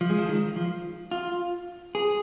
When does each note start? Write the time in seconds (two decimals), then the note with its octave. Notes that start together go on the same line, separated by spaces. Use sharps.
0.01 F3
0.10 G#3
0.19 F3
0.29 D#3
0.56 F3
1.11 F4
1.95 G#4